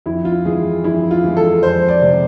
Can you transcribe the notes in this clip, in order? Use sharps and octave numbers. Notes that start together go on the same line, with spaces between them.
F2 E4
F4
E3 G#3 G#4
F2 E4
F4
E3 G#3
A4
F2 C5
D5
C3 G#3